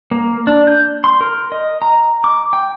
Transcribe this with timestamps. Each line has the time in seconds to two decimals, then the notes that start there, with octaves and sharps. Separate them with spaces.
0.11 A#3
0.47 D4
0.67 G6
1.04 C6
1.21 A#4
1.52 D#5
1.82 A#5
2.24 D6
2.53 G5